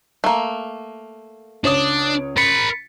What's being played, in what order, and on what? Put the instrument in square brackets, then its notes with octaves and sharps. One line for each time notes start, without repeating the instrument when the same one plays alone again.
[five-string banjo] A3 A#3
[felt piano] C#2 C#5 D#6 [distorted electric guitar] D4
[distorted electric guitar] A#4 B5 [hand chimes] A6 B6 C#7